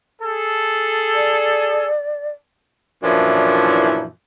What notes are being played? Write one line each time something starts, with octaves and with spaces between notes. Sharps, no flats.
G#4 A4
D5
F#2 A#2 E3 F3 D4 E4